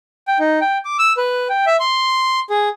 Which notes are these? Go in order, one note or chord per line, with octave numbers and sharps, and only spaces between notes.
G5
D#4
G5
D6
E6
B4
G5
E5
C6
G#4